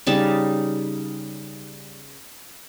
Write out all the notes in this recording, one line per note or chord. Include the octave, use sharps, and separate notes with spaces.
C#3 G3 D#4 A5